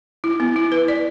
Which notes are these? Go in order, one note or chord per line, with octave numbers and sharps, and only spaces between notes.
E4
B3
E4
B4
D5